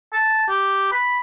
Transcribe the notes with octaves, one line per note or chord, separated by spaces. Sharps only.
A5
G4
B5